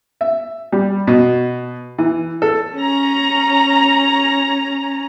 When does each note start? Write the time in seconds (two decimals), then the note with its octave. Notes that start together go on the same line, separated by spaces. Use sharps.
0.21 E5
0.72 G3
1.07 B2
1.98 E3
2.42 A4
2.76 C#4 A#5